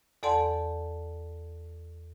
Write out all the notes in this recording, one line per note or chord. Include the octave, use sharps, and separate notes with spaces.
E2 A4 D5 F#5 A5 C6